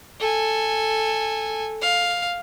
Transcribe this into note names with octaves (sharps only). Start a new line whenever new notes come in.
A4 G#5
F5